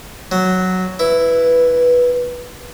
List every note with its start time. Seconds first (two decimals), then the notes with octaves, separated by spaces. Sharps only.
0.32 F#3
0.99 E4 B4